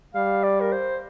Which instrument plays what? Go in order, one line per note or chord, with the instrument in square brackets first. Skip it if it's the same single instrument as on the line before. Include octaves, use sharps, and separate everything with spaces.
[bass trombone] G3 [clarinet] F5
[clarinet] D5
A#4
C5